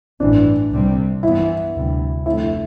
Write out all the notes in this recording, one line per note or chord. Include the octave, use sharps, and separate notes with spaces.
A1 G2 E3 D4
C2 C3 G3 C4
G2 E3 B3 E4
D2 C3 G3
F1 F2 D3 A3 E4